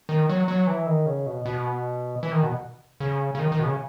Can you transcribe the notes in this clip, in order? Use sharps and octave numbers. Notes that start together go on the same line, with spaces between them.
D#3
F#3
F#3
E3
D#3
C#3
B2
B2
E3
D#3
B2
C#3
C#3
D#3
D#3
B2
C#3